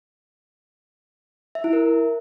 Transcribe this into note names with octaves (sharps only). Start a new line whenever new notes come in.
E5
E4
A#4